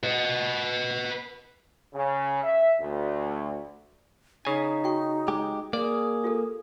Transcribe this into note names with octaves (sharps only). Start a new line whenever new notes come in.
B4 D#5
C#3
E5
D2
C#3 D#4 G#5
F#4 G5 C#6
G#3 G4
A#3 G#4 D5
F4 G4 A4